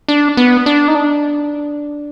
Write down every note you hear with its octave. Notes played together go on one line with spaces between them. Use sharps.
D4
B3
D4
D#4
D4